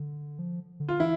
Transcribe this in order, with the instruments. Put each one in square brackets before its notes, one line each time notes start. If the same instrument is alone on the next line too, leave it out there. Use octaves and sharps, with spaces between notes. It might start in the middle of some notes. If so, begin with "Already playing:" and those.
Already playing: [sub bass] D3
F3
D3
[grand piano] F4
[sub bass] E3 [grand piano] E4